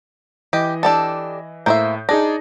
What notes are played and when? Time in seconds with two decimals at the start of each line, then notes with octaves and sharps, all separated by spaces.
0.53 E3 G4 D#5
0.83 D4 G4 A4
1.66 A2 A#3 C5 E5 G6
2.09 D4 D#4 G#4 A#6